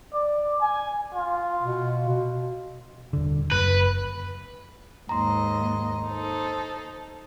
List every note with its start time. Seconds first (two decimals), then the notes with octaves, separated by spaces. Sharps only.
0.13 D5
0.61 G#5
1.14 F4
1.63 B2
2.09 B2
3.13 D#1 D3
3.52 F#1 B4
5.09 D#2 G#2 D#5 A#5 C6
6.07 D#4 A4 C5